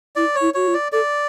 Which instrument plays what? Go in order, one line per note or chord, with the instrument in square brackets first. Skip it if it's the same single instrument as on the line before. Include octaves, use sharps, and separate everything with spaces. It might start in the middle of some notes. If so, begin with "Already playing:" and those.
[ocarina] E4 [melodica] D5
[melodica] C#5
[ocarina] E4
[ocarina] F#4 [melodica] C#5
[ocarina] F4
[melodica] D5
[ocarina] A4 [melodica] D5